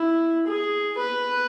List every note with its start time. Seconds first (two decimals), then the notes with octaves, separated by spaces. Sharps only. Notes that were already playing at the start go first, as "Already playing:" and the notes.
Already playing: E4
0.47 G#4
0.97 B4